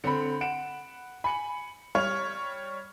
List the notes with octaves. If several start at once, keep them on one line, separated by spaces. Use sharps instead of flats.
D3 C4 B5 C#7
F#5 D7 E7
G#5 B5 C#7 F#7
G3 C#5 F6 F7